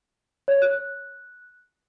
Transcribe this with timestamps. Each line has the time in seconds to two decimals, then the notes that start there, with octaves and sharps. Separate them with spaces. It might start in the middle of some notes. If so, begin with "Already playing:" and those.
0.48 C#5
0.62 F#6